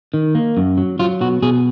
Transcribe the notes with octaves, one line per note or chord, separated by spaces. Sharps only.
D#3
A#3
F#2
F#3
F#3 F4
B2 F#4
B2 G#4